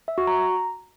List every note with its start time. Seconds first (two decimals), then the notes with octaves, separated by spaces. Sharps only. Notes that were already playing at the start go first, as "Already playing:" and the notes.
0.08 E5
0.18 F#4
0.27 A#5